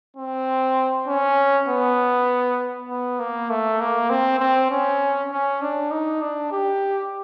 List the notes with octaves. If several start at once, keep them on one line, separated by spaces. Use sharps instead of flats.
C4
C#4
B3
B3
A#3
A3
A#3
C4
C4
C#4
C#4
D4
D#4
D4
G4